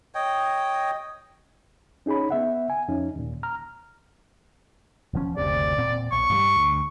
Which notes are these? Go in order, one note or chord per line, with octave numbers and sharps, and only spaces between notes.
C#5 D#5 G5
C#4 D#4 G#4 C#5 B5
B3 E5 F#5
G#5
F2 C#4 D#4
D#2 A#2
A#5 F6
E1 F3 C#4
F#1 D2 C3 D5
E1 A#2 C4
B1 C#6
G2 E3 G3
D2